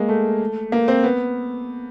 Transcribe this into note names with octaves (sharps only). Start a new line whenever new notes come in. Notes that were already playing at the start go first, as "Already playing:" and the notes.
Already playing: G#3 A#3
A3
A#3
C4
B3